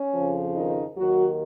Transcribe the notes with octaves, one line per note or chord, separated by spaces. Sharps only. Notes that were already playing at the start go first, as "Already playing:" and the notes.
Already playing: C#4
F2 C#3 F3
D#3 D#4
D#2 D#3 F#3 F#4